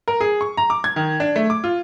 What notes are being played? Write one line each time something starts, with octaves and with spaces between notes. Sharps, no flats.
A#4
G#4
C#6
A#5
D6
G#6
D#3
D4
A3
D6
F4